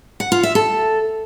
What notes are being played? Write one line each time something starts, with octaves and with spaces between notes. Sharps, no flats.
F#5
F4
E5
A4